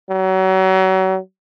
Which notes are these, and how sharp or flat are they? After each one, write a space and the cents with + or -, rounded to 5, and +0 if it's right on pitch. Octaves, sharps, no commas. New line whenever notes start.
F#3 +35